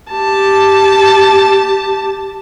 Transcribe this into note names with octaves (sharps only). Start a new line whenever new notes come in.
G4 A5